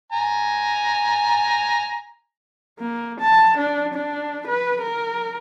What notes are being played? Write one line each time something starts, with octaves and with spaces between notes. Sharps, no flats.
G#5 A#5
A#3
A5
D4
D4
B4
A#4